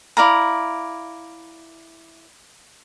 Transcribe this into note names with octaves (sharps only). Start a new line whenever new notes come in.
E4 D5 F5 A#5